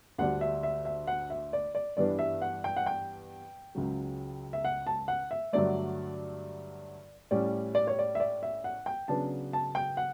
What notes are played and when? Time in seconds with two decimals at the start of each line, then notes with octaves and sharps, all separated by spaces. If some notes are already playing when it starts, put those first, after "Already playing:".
0.18 D2 D3 G3 D4 F#5
0.41 E5
0.63 E5
0.85 E5
1.07 F#5
1.30 E5
1.53 D5
1.75 D5
1.97 G2 E3 G3 B3 D4 D5
2.19 E5
2.42 F#5
2.64 G5
2.76 F#5
2.86 G5
3.75 C#2 C#3 F#3
4.53 E5
4.65 F#5
4.87 A5
5.08 F#5
5.31 E5
5.53 G2 D3 F#3 A3 D5
7.31 A2 G3 C#4 D5
7.75 D5
7.87 C#5
7.99 D5
8.15 E5
8.20 D5
8.43 E5
8.64 F#5
8.86 G5
9.08 C#3 F#3 B3 D4 A5
9.53 A5
9.75 G5
9.97 F#5